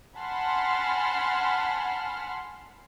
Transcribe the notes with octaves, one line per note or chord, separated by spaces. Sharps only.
F#5 G#5 A5 B5 C6 F6